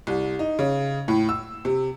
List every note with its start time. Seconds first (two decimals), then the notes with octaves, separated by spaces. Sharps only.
0.07 C2
0.39 D#4
0.59 C#3
1.08 A2
1.29 E6
1.65 C3